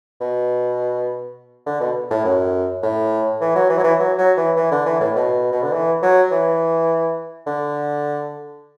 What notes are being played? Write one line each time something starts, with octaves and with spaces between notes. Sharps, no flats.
B2
D3
B2
A2
F#2
A2
E3
F#3
E3
F#3
E3
F#3
F#3
E3
E3
D3
E3
A2
B2
B2
D3
E3
F#3
E3
D3